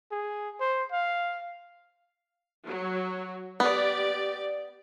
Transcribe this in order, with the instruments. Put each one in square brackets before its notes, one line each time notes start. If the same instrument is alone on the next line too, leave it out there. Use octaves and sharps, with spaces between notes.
[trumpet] G#4
C5
F5
[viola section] F#3
[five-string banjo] B3 [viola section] G4 D5